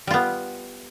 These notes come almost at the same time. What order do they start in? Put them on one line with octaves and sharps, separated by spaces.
G3 F4 B3